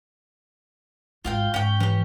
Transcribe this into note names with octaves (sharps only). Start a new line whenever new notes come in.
G#1 G#2 F4 F5 G5
G#2 C#4 G5
E3 C#4 G4